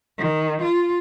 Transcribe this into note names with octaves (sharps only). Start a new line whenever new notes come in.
D#3
F4